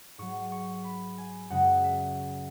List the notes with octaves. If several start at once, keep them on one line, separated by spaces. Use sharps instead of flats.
G#2 F#3 C#6
C#6
B5
G#5
F#2 C#3 G#3 F#5
E5